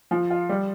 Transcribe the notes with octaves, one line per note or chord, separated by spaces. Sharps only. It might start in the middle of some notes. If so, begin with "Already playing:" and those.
F3
F4
G3